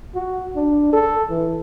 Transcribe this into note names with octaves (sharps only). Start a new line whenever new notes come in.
F#4
D4
A4
E3